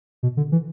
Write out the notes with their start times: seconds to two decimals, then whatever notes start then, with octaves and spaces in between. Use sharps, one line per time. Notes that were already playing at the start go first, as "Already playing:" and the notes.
0.23 B2
0.37 D3
0.52 E3